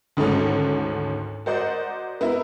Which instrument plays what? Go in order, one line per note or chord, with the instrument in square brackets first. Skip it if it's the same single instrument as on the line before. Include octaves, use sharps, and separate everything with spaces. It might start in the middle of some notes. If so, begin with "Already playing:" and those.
[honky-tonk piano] D2 G#2 D#3 A3 C#4
F#4 A#4 C5 D5 D#5 F#5
B3 E4 A#4